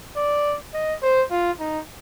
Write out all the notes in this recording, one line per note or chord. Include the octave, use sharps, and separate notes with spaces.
D5
D#5
C5
F4
D#4